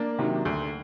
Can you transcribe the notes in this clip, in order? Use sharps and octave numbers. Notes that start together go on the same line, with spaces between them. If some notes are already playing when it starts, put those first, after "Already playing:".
Already playing: A#3 D4
C3 D#3 F#3
D2